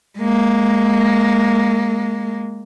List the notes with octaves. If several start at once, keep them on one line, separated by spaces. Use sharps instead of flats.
G#3 A#3